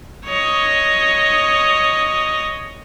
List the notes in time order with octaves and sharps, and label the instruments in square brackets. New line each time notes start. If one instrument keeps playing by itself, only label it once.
[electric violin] C#5 D#5